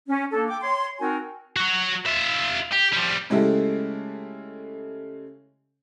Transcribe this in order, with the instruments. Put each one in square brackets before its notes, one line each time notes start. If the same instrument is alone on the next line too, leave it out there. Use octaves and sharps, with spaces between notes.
[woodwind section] C#4
A#3 D4 A4
G5 D6
C#5 C6
C4 D#4 F#4 A#4 G#5
[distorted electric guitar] F#4 C#5
F4 E5
G4
F3 G3
[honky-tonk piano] C#3 G#3 A3 E4 G4 A4